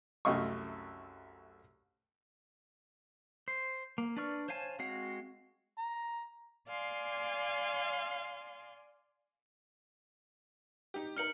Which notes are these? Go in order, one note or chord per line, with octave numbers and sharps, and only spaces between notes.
C2 F#2 A3 D#5 F5 C#6
C5
A#3
D4 B4 D5 C#6 F6
C5 C#5 F5 G#5 A5
G#3 C4 F#4 F5 F#5
A#5
D5 F5 G#5 C6
D#4 G4
D#4 A#4 F6 C#7 F#7